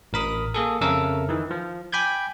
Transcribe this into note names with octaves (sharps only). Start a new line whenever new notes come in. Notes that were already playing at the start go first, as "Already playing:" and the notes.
A1 A#4 B5 D#6
A#3 G#4 A4
F2 C#3 A4 A#4 E5 E6
D#3 E3
F3
G5 G#5 B5 D6 G6 G#6